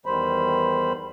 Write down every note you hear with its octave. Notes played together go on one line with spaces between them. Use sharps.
E2 D#3 G3 C5 B5